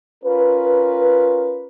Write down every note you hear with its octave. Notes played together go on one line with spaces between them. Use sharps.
C#4 F4 A#4 B4